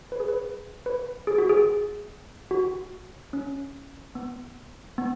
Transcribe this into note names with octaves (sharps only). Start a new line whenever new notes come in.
B4
G#4
B4
B4
G#4
F#4
G#4
F#4
C#4
B3
B3